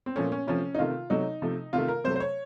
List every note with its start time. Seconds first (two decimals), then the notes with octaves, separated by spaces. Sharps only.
0.06 C4
0.16 A#2 F3 A3 C#4
0.32 C#4
0.47 C3 F3 A3 C#4
0.74 D#4
0.79 C3 D#3 A3 F4
1.10 C3 F#3 A3 D#4
1.42 C3 F3 A3
1.73 C3 D#3 A3 F4
1.88 A#4
2.04 C3 F#3 A3 C5
2.16 C5
2.20 C#5